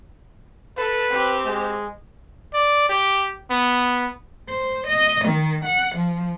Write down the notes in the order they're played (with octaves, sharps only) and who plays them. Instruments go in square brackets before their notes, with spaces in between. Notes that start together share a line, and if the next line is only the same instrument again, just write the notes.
[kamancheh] A4 [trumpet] B4
[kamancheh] C4 G4
[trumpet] G#3
D5
G4
B3
[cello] C5
D#5
D#3
F#5
F3